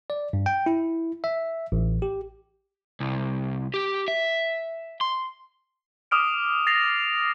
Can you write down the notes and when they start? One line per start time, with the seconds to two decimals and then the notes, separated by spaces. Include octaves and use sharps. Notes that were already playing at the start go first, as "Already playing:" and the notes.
0.10 D5
0.33 G2
0.46 G5
0.66 E4
1.24 E5
1.72 A1
2.02 G4
3.00 C2
3.74 G4
4.08 E5
5.01 C6
6.11 D6 D#6 F6 D7
6.67 A6 A#6 C7 F7